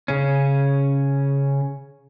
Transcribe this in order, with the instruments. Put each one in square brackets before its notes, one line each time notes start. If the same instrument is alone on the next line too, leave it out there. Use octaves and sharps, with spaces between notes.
[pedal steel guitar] C#3 C#4